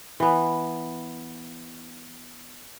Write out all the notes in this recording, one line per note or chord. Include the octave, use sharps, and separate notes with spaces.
E3 B3